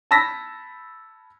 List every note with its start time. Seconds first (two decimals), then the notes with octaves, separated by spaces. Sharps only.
0.11 A5 B5 E6 A#6 B6